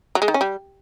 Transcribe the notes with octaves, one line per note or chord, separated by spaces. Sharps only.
F#3
G#3
D#3
C#4
G3